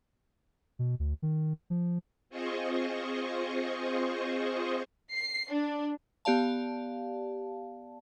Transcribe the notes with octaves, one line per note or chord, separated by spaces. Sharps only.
B2
D2
D#3
F3
C4 F4 G#4 C5 D#5 C#6
C7
D4
B3 G4 D5 F5 A5